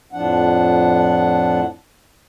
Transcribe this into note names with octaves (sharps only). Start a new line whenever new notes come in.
F2 A2 F3 D4 F#5